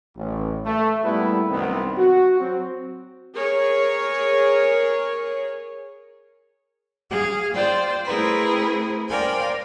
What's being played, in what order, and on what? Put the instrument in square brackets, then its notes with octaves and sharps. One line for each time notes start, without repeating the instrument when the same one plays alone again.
[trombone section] A1
A3
A#2 G3 A3 B3 E4 B4
C2 F#2 D#3 B3 C4
F#4
F#3 C4
[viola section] G#4 A#4 C#5
[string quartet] G#4 F5
F4 C5 D5 G5
A3 C4 E4 G#4 A#4 B4
A#4 C5 D5 F5 G5 G#5